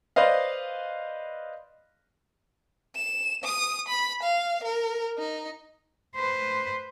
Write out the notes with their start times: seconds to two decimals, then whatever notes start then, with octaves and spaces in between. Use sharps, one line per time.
0.16 B4 C5 D5 D#5 F5
2.96 E7
3.44 D#6
3.89 B5
4.23 F5
4.64 A#4
5.18 D#4
6.15 B4 C5